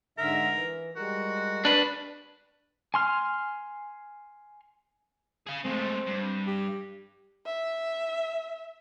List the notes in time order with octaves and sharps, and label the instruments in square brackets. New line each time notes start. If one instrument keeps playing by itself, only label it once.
[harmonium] G#2 D3 E5 [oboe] A#4
[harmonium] E3
[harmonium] G3 G#3 A#4 [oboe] F#4
[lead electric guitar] D4 B4
[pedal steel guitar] G#5 C6 F6
[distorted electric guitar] G#4 F5
[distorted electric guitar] G#3 A3 [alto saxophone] C4
[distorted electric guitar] G2
[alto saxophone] G4
[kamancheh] E5